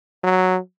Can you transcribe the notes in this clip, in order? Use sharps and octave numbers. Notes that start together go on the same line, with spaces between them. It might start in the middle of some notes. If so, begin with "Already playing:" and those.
F#3